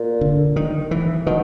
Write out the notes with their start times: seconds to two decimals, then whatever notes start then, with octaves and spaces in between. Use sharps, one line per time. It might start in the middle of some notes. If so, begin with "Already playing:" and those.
Already playing: A#2
0.21 D3
0.56 D#3
0.91 E3
1.26 B2 D#3